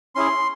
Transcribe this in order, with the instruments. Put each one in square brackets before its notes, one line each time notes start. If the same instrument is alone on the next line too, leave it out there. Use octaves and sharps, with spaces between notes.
[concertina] C#4 E4 G#4 C6